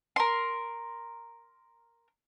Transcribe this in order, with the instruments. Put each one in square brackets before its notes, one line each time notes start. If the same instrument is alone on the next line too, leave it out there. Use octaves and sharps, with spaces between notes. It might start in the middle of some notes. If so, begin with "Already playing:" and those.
[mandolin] A#4 C6